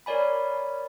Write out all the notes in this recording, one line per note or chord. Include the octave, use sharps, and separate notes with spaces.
A#4 C#5 D5 G#5 B5